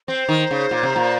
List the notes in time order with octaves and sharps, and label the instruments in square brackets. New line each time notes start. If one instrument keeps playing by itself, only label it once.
[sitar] C4 [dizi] C5
[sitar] D#3
C#3
A#2
C3
A#2